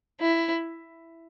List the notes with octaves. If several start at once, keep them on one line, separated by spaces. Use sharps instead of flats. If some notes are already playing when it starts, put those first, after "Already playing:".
E4